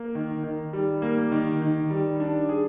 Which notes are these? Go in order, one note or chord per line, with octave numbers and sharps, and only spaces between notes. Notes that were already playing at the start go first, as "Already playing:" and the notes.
Already playing: A#3
D#3
D#3
G3
A#3
D#3
D#3
G3
D4
G#4